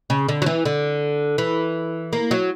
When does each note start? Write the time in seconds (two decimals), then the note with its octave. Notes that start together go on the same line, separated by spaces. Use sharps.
0.10 C#3
0.29 D3
0.42 F#3
0.46 E3
0.65 D3
1.38 E3
2.13 A#3
2.31 F#3